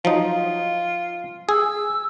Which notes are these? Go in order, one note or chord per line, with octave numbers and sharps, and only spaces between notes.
F3 F#3 D#4 F4
G#4 E6